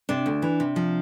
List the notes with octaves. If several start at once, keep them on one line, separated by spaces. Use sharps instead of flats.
C3 D4
D2
E3
C3
F3